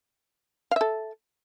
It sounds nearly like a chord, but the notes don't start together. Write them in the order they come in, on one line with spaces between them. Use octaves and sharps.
F5 E5 A4